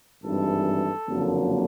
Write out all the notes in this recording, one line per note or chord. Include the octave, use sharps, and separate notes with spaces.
G#1 G2 E3 A4
F#1 F2 D3 F#3 A#3